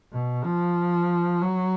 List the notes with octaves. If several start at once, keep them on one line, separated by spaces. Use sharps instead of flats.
B2
F3
F#3